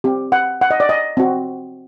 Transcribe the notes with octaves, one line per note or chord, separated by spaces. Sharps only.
C4 G4
F#5
F#5
D#5
D5
D#5
C4 F#4